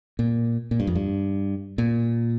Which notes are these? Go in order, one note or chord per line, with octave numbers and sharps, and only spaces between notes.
A#2
A#2
G2
F2
G2
A#2